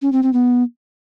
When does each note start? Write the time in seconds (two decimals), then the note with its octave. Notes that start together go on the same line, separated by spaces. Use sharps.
0.02 C#4
0.12 C4
0.23 C4
0.33 B3